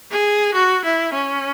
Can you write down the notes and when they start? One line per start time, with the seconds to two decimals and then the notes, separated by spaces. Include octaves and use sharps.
0.11 G#4
0.54 F#4
0.84 E4
1.13 C#4